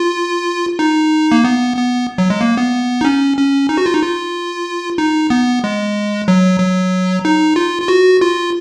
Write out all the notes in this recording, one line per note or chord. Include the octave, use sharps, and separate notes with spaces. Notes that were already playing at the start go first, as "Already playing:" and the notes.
Already playing: F4
D#4
A#3
B3
B3
F#3
G#3
A#3
B3
D#4
C#4
C#4
D#4
F#4
F4
D#4
F4
D#4
B3
G#3
F#3
F#3
D#4
F4
F4
F#4
F4